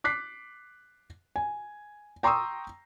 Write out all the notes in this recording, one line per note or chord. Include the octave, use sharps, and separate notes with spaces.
D6 F#6 B6 C7
G#5
G5 A#5 C6 C#6 D#6 E6